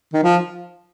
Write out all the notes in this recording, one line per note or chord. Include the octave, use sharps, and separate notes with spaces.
D#3
F3